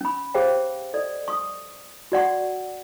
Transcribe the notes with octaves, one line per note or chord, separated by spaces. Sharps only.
C#4 B5
G4 G#4 C5 C#5 F5 G5
A4 D5 D#5
C#6 D#6
F#4 D5 F#5 C#6